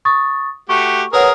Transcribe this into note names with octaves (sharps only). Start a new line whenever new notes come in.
C#6 D#6 A6
A3 F#4 G4 C#6
G#4 A#4 B4 C#5 F#5